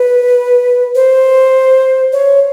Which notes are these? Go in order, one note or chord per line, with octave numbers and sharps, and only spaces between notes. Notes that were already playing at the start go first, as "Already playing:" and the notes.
Already playing: B4
C5
C#5